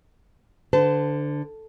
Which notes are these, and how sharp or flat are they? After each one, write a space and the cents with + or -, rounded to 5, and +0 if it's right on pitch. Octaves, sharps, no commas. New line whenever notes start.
D3 +0 C5 -40 A5 +0